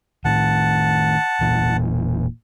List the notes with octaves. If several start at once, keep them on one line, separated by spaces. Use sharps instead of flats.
A2 D#3 F#5 A5
E1 A#2 E3